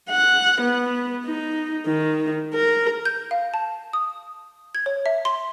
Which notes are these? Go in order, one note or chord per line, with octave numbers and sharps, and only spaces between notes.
F#5
B3
D#4
D#3
A#4
G6
F5
A5
D#6
G#6
C#5
E5
C6